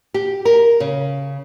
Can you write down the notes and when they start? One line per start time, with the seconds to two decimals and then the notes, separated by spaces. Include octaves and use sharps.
0.14 G4
0.45 A#4
0.80 C#3